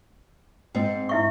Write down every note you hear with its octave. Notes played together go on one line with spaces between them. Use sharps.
G#2 C4
E4 E5 C#6